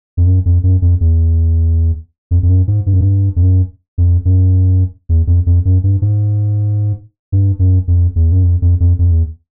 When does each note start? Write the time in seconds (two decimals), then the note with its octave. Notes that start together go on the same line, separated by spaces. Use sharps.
0.17 F2
0.26 F#2
0.45 F2
0.63 F#2
0.82 F2
1.00 E2
2.31 F2
2.43 F2
2.49 F#2
2.67 G#2
2.86 G2
2.93 F#2
3.01 G2
3.36 F2
3.42 F#2
3.98 F2
4.25 F#2
5.09 E2
5.27 F2
5.46 F2
5.65 F#2
5.84 G2
6.02 G#2
7.32 G2
7.59 F#2
7.88 F2
8.16 E2
8.32 F#2
8.43 F2
8.62 F2
8.80 F2
8.99 F2
9.11 E2